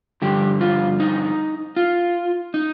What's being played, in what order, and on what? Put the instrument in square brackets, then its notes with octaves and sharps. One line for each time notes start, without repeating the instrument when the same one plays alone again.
[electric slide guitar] G2 D3 F3 G4
F4
D#4
F4
D#4